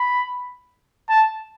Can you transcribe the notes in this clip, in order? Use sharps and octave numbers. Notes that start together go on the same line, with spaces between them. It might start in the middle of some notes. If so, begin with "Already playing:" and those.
Already playing: B5
A5